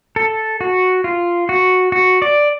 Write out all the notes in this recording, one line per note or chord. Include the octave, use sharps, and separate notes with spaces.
A4
F#4
F4
F#4
F#4
D5